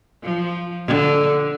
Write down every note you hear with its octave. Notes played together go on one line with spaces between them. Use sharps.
F3
D3